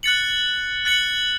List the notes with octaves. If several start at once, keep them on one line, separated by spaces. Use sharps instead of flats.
F#6 A6 C#7 F#7
F#6 A6 C#7 F#7